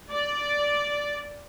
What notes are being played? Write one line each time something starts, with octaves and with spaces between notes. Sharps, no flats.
D5